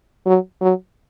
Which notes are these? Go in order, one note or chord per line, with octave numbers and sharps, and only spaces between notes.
F#3
F#3